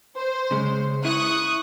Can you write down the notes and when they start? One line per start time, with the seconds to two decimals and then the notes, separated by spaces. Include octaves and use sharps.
0.16 C5
0.51 C#3 G#3 C#4
1.05 E4 C#6 D#6 F#6